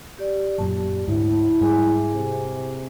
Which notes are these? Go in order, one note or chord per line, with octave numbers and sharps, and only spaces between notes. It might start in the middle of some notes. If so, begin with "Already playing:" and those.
G4 D5
F#2 A#2 F#3 G4 A5
D2 G#2 E4
G#2 G3 G#4 G#5 D6
C3